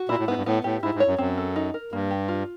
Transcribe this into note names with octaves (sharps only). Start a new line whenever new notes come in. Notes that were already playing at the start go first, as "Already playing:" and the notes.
Already playing: F#4
A#2 E4
A2
G#2 B3
G2
A2 B3
A2 G4
G#2 E4
G#2
C#5
F#2
F#2 C4
A4
D#4
A#4
G2 A#3
G4
F4